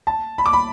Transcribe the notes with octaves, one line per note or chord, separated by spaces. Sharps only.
A5
B5
D6
B5